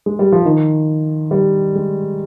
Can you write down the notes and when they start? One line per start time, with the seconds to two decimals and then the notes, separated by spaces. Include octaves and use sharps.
0.06 G#3
0.19 G3
0.32 F3
0.45 D#3
1.31 G3
1.75 G#3